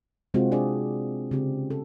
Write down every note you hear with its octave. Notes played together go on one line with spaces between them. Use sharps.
C3 G#3 C4 F4 F#4
D4 G#4 D5
C#3 C4 G4
A4